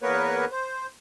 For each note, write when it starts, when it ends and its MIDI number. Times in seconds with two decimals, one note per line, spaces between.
0.02 0.45 40
0.02 0.45 58
0.02 0.45 59
0.02 0.45 70
0.02 0.45 71
0.02 0.45 73
0.51 0.87 72